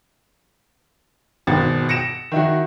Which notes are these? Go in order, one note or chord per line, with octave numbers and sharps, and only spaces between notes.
G#1 B2 A6
A#6 C#7 D7 E7
D#3 E4 F#4